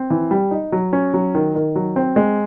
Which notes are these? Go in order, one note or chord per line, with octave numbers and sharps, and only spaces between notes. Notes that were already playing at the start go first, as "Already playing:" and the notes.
Already playing: C4
E3
G3
D#4
F#3
C#4
F#3
D#3
D#3
F#3
C4
G#3